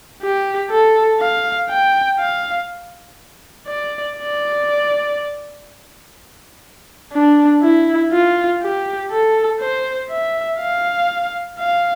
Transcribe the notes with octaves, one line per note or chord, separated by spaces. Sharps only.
G4
A4
F5
G5
F5
D5
D5
D4
E4
F4
G4
A4
C5
E5
F5
F5